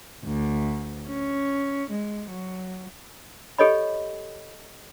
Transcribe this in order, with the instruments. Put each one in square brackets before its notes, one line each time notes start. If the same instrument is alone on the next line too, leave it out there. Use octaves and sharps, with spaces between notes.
[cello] D2
C#4
G#3
F#3
[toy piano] G4 A4 C#5 D#5 B5